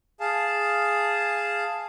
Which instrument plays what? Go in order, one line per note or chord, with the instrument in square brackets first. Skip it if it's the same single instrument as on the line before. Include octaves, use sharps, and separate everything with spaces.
[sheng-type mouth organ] G#4 F5 A5